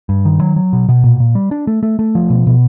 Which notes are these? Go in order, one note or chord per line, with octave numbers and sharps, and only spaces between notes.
G2
D#3
F#3
F#3
B2
B2
A#2
A#2
G3
D4
A3
A3
A3
F3
B2
B2